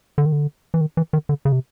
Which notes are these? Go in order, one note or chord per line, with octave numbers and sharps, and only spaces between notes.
D3
D#3
D3
E3
D#3
E3
D#3
D3
C#3
C3